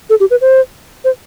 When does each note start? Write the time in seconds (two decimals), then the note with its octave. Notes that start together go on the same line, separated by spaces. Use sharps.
0.10 A4
0.20 G4
0.31 B4
0.41 C5
1.04 C5